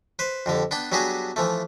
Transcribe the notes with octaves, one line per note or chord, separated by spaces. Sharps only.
B4 C5
F2 D3 G3
B3 D4 G5
F#3 G3 B3 D4 F#4 G#4
E3 F3 A3